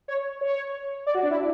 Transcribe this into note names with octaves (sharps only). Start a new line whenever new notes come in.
C#5
C#5
D5
F#4
D4
E4